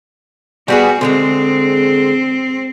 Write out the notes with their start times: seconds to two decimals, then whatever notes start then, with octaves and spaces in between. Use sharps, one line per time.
0.68 G3 B3 F#4 G#4
1.01 D3 F3 G#3 C4